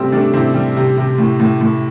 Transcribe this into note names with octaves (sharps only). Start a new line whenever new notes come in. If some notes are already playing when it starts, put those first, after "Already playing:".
Already playing: C3 G3 A3 C4
G3 A3 D4
C3 C4 E4
G3
C3
C3
A2
A2
A2